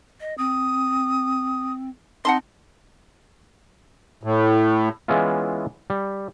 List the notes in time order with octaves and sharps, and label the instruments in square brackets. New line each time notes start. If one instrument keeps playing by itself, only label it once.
[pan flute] D#5
[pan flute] C4 [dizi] D#6
[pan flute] C4 [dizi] D#4 [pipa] F#5 A5 C6
[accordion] A2
[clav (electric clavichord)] E3 G#3 B3 C#4 E4 F4
G3